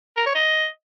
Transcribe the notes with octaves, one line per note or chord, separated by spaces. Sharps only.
A#4
C#5
D#5